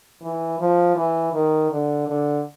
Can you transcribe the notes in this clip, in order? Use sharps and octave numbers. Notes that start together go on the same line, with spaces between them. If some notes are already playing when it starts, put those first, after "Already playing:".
E3
F3
E3
D#3
D3
D3